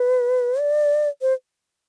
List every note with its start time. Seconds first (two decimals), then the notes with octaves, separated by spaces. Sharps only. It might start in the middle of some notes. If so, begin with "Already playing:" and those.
Already playing: B4
0.60 D5
1.21 C5